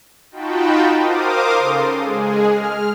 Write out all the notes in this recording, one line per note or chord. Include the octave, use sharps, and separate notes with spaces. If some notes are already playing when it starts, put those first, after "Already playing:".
D#4 F4 F#4 G5 A5 B5
A#4 C5 F5 D6 D#6
C#3 A4 C6
G#3 G#4
F6